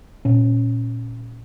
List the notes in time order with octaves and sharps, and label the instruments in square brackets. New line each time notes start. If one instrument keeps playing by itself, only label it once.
[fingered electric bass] A#2 C#4